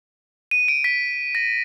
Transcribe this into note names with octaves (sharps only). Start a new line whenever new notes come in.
D#7
D7
B6
A#6